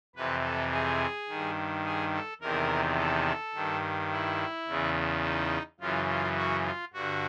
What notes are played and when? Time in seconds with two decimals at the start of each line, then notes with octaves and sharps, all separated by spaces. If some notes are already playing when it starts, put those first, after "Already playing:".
0.16 F2 C3 E3 B4
0.44 A4
0.72 G#4
1.29 G2 D#3
1.85 G#4
2.14 A4
2.41 E2 C3 D#3 A#4
2.98 A4
3.54 G2 D#3
4.11 E4
4.68 E2 C#3 E3
5.23 D#4
5.80 F#2 C#3 E3 F4
6.08 F4
6.37 F#4
6.65 F4
6.93 G2 D3 F#4